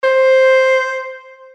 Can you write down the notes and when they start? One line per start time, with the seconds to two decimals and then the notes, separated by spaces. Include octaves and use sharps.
0.03 C5